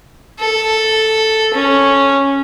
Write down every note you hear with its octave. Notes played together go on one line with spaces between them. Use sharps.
A4
C#4